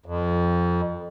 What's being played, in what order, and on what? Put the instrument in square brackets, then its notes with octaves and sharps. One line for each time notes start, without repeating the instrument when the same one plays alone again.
[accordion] F2